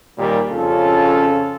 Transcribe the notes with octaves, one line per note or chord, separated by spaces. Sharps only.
D#2 A#2 D#3 G3 G4 A#4
F2 C#3 C#4 F4 A4